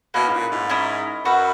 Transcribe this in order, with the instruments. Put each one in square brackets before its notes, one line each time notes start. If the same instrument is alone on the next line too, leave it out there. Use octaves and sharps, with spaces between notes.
[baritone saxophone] B2 [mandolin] A#3 C#4 E4 B4
[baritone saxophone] G#2
A#2
G#2
[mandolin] C#4 E4 A#4 D#5
[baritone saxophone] F#2 [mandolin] F#4 B4 E5